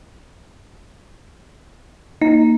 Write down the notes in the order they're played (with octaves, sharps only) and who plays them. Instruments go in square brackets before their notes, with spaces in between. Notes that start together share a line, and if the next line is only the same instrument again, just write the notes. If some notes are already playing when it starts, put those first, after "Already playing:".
[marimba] A#3 [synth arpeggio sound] D#4